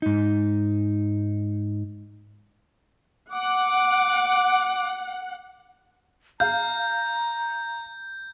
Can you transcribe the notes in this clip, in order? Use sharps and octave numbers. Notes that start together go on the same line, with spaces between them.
G#2 D#4
F#5 D6
F5 A#5 G6